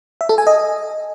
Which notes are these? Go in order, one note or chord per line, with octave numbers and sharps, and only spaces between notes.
E5
A4
G#5
D#5